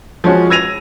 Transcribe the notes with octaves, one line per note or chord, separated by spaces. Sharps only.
F3 G#3 C#4 F#4
E6 G#6 A#6 D#7 F7